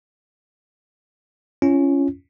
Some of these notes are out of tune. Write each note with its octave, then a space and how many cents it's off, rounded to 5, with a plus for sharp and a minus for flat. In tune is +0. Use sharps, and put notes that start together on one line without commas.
C#4 +0 F4 -40